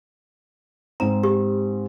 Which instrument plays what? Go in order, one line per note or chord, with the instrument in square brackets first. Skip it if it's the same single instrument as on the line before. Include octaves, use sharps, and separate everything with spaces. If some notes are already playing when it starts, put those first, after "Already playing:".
[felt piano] G#2 C4 [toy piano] A#5
[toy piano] G4